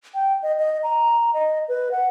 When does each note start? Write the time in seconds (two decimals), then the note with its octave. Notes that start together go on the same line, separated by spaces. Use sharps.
0.14 G5
0.42 D#5
0.58 D#5
0.83 A#5
1.34 D#5
1.69 B4
1.91 F#5